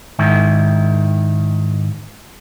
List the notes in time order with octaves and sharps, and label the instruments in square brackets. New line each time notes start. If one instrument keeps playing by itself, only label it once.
[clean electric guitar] G#2 D#3 E4